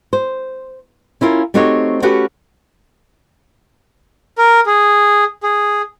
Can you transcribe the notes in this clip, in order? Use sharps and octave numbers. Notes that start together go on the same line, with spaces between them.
C5
C#4 E4 F4 A#4
A3 C4 D#4 F#4 G4 C#5
A3 C#4 F#4 G4 B4 F#5
A#4
G#4
G#4